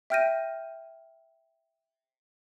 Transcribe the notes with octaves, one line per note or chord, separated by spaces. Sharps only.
E5 G5 F6 G6 A#6 D#7